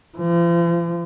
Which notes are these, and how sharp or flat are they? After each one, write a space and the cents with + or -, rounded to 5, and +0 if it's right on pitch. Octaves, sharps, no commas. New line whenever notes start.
F3 -40